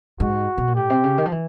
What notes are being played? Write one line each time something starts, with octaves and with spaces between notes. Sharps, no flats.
G#2 F#4
B2
A#2
A2 G4
C3
C#3
D#3
F3
E3